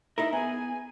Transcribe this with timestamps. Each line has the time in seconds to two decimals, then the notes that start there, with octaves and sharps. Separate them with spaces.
0.18 D#4 E4 A#4 E5
0.33 B3 G#4 G#5